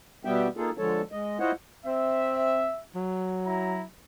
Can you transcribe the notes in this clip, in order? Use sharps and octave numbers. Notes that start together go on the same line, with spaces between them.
B2 G3 B3 G4 E5 G5
A#3 D#4 F4 G#4 A4
D3 F3 G#3 A4 C#5 A5
G#3 D#5
E4 F4 C5 C#5 D#5 F#5
C4 E5
F#3
E4 A#5